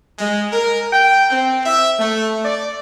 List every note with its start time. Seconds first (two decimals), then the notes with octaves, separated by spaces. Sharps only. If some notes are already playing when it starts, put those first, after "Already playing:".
0.19 G#3
0.52 A#4
0.93 G5
1.30 C4
1.65 E5
1.99 A3
2.44 D5